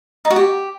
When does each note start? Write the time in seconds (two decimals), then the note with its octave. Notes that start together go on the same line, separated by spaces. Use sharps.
0.25 D#4
0.30 F#4
0.36 G4